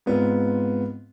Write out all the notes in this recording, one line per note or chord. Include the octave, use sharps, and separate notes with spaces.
G#2 B3 C4 F4